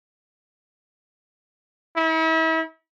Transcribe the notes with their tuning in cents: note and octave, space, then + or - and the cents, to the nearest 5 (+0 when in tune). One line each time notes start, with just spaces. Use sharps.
E4 -40